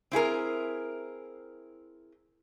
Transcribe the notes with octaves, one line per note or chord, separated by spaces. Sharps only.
C4 E4 G#4 A#4